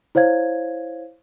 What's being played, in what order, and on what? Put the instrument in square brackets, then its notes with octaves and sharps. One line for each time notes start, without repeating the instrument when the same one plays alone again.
[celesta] E4 C5 C#5 F5 G#6